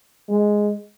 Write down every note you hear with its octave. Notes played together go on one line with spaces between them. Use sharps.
G#3